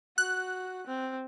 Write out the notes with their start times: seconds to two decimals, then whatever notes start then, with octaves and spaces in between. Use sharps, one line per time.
0.18 F#4 F#6
0.87 C4